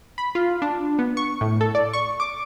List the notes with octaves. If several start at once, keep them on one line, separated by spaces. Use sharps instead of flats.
B5
F4
D4
B3
C#6
A2
A4
D5
C#6
D6